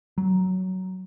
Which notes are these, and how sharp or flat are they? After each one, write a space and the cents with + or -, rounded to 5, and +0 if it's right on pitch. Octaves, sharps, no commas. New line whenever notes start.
F#3 +10